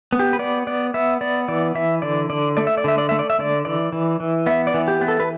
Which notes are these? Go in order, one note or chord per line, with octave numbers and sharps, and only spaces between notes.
B3
G4
B4
B3 D5
B3 D5
B3 E5
B3 D5
E3 D5
E3 E5
D3 D5
D3 D5
A3 D5
E5
D5
D3 E5
D5
A3 E5
D5
E5
D3 D5
E3 D5
E3
E3
B3 E5
D5
E3
G4
B3
A4
B4